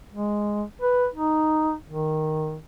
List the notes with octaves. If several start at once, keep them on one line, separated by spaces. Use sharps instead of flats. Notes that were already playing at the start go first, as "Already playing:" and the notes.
G#3
B4
D#4
D#3